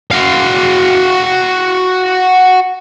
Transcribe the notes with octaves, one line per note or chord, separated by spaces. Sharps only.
F#4 F5